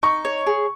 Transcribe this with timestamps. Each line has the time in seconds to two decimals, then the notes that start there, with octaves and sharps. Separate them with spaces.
0.03 D#4 C#6
0.25 C#5
0.46 G#4